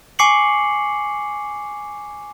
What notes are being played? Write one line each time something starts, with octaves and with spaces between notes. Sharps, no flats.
G#5 C#6 D6 C7 C#7 F#7